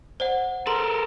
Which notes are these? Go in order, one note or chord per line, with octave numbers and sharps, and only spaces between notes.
C5 D5 F#5
A4 A#4 A#5 C6